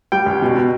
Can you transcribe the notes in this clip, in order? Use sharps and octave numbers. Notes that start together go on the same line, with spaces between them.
G3 G5
C#2
B2
B2